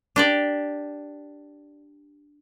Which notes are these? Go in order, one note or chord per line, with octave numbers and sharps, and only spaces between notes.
D4 G4 D5